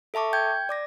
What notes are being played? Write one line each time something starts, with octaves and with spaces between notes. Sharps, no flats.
A4 E5 A5 C#6 D6
G5 G6 G#6
D5 D6 A#6